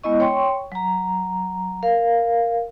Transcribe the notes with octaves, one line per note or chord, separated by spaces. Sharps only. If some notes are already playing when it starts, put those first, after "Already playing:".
G#3 B3 E4 D#5 C#6
C#5 G5 C6 C#6
F#3 A#5
A#4 F5